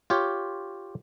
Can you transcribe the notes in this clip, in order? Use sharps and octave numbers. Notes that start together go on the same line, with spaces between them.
F4 G4 C#5